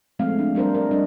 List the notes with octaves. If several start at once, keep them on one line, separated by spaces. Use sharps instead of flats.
F3 G#3 A3 C4 F5
D4
G3 D4 A#4 C5
A#4 D5
G3 D4 D#5